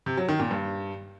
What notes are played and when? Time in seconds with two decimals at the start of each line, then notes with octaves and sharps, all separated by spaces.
0.06 C3
0.17 F#3
0.28 D#3
0.40 A#2
0.51 G2